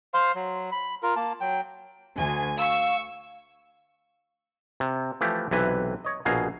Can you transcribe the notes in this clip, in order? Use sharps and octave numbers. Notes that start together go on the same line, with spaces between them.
C5 F5 C6
F#3
B5
F4 A#4
A#3 A5
F#3 G5
D2 G#5
F5 C#6 E6
C3
E3 F3 A3 G4
B1 C3 E3 B4
C#5 D#5
A#1 B2 G#4 F5 A#5